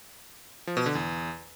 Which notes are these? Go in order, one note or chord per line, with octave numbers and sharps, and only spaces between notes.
F3
B2
D3
E2